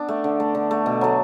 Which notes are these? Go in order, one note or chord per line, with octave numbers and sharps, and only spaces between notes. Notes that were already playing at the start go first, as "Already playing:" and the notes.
Already playing: B3 D4
A3
D3
A3
D3
A3
B2
F#3 A3